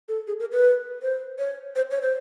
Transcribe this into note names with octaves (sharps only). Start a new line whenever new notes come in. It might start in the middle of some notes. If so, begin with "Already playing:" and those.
A4
G#4
A#4
B4
C5
C#5
C5
C#5
C5